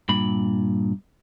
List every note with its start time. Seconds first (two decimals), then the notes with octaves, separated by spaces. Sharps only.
0.09 G2 A#2 B5